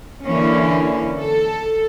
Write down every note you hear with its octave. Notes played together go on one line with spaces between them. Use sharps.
D3 E3 A#3 C#4
A4